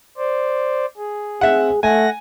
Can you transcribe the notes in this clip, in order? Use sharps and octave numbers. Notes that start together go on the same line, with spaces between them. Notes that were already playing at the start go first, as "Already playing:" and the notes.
C5 D5
G#4
C4 G#4 E5 F#5
A3 F#5 G#5 A#6